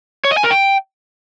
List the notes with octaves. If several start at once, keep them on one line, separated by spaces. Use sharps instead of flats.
C#5
D#5
G#5
A#4
G5